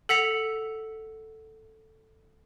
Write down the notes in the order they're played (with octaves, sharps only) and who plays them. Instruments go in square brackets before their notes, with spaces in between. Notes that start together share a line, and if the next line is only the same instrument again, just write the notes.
[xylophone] A4 F#5 B6 F7